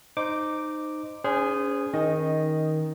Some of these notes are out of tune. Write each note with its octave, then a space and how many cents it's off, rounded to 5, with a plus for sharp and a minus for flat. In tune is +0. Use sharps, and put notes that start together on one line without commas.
D#4 -15 C5 -10 D6 +0
C#4 +30 G#4 -10 C5 -30
D#3 +10 C#4 +0 D#5 +0